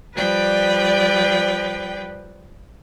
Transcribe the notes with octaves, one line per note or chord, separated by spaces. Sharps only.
F3 G3 B4 D5 G5